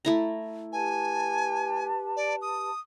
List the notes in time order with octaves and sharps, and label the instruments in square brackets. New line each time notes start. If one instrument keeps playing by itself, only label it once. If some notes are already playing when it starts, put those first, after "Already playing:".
[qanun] A3 E4 A#5
[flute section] G4 B4 A5 [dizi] G#5
[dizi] D5
D#6